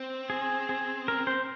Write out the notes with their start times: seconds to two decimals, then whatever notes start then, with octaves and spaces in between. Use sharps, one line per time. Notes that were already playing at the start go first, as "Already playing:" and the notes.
Already playing: C4
0.30 G#4
0.69 G#4
1.08 A#4
1.27 C5